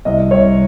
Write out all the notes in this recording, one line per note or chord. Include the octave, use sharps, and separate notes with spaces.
C2 D#5
C2 C#5